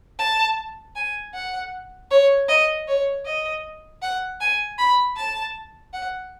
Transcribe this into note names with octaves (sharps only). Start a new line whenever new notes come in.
A5
G#5
F#5
C#5
D#5
C#5
D#5
F#5
G#5
B5
A5
F#5